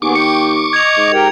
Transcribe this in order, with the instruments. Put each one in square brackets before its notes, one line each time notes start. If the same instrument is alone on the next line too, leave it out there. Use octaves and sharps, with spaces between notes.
[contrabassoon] D#2 [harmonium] B3 G#4 [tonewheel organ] C#6 D6
[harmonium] G5 [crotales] C#7
[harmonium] D#5 [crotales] G#6 F7
[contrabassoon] G#2
[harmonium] G4 A#4 G5